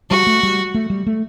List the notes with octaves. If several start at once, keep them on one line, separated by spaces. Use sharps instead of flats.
G3 F#4
A3
G3
A3
G3
A3